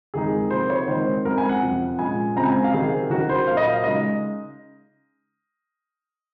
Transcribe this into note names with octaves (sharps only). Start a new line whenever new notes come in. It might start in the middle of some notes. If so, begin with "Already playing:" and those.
F2 D#3 G#3 D#4 G#4
C3 F3 A#3 D#4 C5
C#5
D#3 G#3 C4 D#4 C5
F#2 F3 G#3 C4 A#4
G#5
F#5
F2 C3 F3
A#2 F3 G#3 C#4 G#5
F#2 C#3 G#3 C4 A#5
G#5
F5
C3 D#3 F#3 C4 G#4
D#3 F#3 C#4 F#4
C5
A#2 F#3 A#3 F5
D#5
F5
C#3 G#3 D#4 D#5